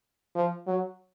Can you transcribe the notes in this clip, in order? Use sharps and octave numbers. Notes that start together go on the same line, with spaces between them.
F3
F#3